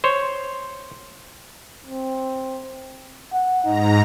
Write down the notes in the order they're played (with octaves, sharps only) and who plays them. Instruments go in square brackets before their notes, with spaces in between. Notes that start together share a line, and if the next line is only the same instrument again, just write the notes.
[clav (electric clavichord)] C5 C#5
[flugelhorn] C4
F#5
[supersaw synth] G#2 A#5 [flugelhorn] D#4